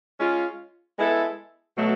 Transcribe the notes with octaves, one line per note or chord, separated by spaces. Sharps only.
G#3 C#4 F4
G#3 B3 E4 A4
B2 F#3 A3